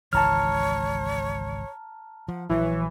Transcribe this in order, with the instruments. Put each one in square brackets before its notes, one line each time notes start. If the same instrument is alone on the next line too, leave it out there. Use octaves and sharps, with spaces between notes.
[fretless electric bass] G#1 C#2 E3 [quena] C#5 [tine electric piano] A5 A#5 F6
[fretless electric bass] F3 [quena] F#5
[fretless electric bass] A#1 F#3 [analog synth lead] E3 [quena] C#5